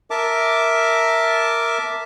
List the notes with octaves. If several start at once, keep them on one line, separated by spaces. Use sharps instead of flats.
A#4 E5 A5 D6